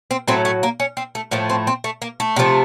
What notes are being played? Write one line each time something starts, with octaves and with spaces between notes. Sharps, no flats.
C4
A2 F#3 A3 C4
A3
A#3
C#4
C4
A3
A2 F3 A3 A#3
C4
C4
A3
A#3
A3
C3 F3 A3